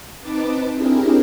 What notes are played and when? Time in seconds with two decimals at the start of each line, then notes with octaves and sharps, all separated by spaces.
0.21 C4 D#4 B4 A5 D6
0.73 C4 D4 E4 G4 G#4 A#4